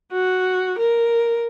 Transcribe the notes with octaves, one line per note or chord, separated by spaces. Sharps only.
F#4
A#4